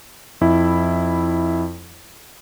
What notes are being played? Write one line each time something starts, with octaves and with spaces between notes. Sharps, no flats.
F2 E4